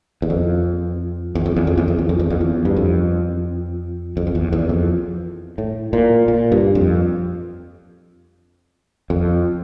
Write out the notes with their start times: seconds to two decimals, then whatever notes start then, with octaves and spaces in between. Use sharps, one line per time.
0.22 E2
0.30 F2
1.35 E2
1.46 F2
1.56 E2
1.67 F2
1.78 E2
1.88 F2
1.99 E2
2.09 F2
2.20 E2
2.30 F2
2.41 E2
2.65 G2
2.76 F2
4.17 F2
4.27 F2
4.35 E2
4.53 E2
4.69 F2
5.58 A2
5.93 A#2
6.28 A#2
6.52 G2
6.75 F2
9.10 F2